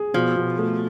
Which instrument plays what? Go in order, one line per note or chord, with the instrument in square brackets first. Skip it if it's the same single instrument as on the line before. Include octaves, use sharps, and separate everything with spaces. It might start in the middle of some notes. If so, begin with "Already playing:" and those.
Already playing: [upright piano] G#4
[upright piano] B2 [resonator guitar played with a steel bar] F3
[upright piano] B2
A3